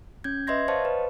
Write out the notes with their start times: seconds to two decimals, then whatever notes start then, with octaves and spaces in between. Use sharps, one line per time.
0.24 C#4 G6 G#6
0.47 B4 D#5 E5 C6 G#6 A#6
0.68 C5 C#5 D#5 F5 A5 C#6
0.85 B4